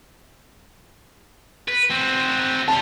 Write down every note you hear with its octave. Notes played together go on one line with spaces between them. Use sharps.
B4
C4 F#4
G3 F4 A5